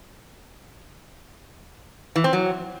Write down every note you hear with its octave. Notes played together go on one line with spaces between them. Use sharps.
E3
C4
F#3